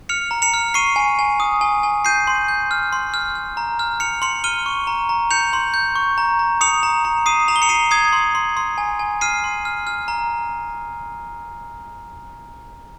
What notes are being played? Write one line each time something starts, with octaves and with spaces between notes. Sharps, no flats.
F6 C#7 F7
A#5
C#7 F7
F6
C#6 C7 D#7
G#5
G#5
D#6
G#5
G#5
G6 C7 D#7
C6
G6
F6
C6
F6
F6
A#5
F6
F6 C#7 F7
C6 C#7 F7
F6 D#7 G7
C#6
A#5
A#5
G6 C#7 F7
C6
G6
C#6
A#5
A#5
D#6 C#7 F7
A#5
A#5
D#6 C7 D#7
A#5 F7
G7
C#7 F7
A#5 C7 D#7
D#6 G#6 C7
C6
C6
C6
G#5
G#5
F6 C7 D#7
C6
F6
F6
A#5